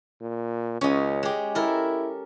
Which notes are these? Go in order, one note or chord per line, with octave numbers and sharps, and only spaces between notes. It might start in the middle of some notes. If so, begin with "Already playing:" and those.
A#2
C#2 C#4 D#5
G#3 G4
E4 A4 A#4